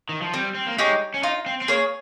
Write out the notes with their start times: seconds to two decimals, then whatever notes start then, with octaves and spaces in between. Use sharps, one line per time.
0.09 D#3
0.22 F3
0.34 G3 C4
0.55 C4
0.66 A#3
0.78 G#3 D#4 G4 C#5
1.14 C#4
1.23 D#4 F4
1.46 C4
1.61 C4
1.68 A#3 G#4 C#5